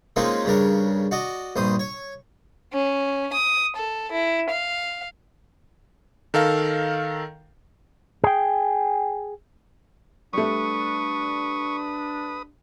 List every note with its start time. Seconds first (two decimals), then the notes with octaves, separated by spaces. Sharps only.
0.16 G#3 A#3 C4 C#4 D#4 F4
0.45 G2 C#3 D4 A#4
1.11 F#4 D5 D#5
1.56 A#1 G2 C5 D#6
1.79 C#5
2.73 C#4
3.34 D#6
3.76 A4
4.12 E4
4.50 F5
6.34 D#3 A4 A#4 F5
8.24 G#4 G5
10.33 G3 A3 D4 B4 C#6 D#6